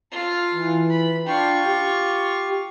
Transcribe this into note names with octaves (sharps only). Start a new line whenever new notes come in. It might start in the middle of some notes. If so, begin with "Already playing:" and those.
F4 A4
E3
B5
D4 F4 G5 C#6
G4